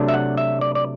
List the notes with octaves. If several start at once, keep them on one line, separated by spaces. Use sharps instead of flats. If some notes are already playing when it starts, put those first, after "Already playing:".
Already playing: C3 F#3 A3 D4
E5
F#5
E5
D5
D5